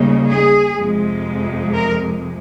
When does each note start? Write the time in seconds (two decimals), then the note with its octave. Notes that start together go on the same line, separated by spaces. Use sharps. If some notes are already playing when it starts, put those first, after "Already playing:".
Already playing: D#2 C#3 G3 A#3 D#4
0.28 G#4
0.77 F2 C3 F3 G#3
1.75 A#4